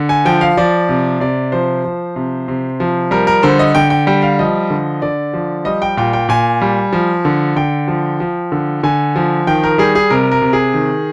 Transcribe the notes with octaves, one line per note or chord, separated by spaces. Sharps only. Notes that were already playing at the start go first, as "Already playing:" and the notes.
Already playing: D3
G#5
F3 G5
F5
F3 D5
C3
C3 D5
F3 C5
F3
C3
C3
F3
G3 A#4
A#4
D3 C5
D#5
D3 G5
G5
G3 G5
F5
F3 D#5
D3
D3 D5
F3
G3 D#5
G5
A#2 G5
G5
A#2 G#5
G3
F3
D3
D3 G5
F3
F3
D3
D3 G#5
F3
D#3 G5
A#4
G3 G#4
G#4
C3 A#4
A#4
C3
G#4
D#3